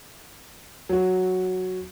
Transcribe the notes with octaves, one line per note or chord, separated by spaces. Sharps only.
F#3 F#4